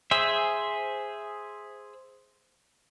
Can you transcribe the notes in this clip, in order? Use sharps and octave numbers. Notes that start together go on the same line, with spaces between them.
G#4 C5 E5